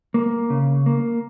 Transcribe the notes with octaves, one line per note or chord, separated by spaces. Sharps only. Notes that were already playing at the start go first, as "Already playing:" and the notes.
A#3
C#3
A#3